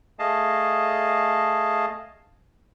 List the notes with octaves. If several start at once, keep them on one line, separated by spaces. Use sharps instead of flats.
A3 G#4 D#5 F5 A5